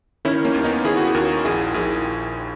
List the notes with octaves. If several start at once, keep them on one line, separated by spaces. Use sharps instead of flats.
D#3 C#4 E4
A#3 C#4
D#2
B3 D#4
D#3 E4 G#4
F#4
G#4
D#2 F#4 A#4
A#1 E4 G#4
A#1 E4 G#4